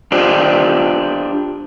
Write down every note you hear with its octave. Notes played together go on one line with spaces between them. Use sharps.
D4 F4 G4 C5 D5